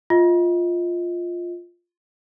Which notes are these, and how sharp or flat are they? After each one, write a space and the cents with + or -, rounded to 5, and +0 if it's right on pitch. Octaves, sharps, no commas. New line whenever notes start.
F4 +0 D#5 +30